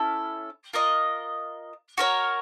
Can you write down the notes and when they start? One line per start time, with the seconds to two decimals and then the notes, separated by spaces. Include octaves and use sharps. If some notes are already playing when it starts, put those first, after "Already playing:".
Already playing: C#4 E4 A4
0.73 F4 A#4 D#5
1.98 F#4 A#4 C#5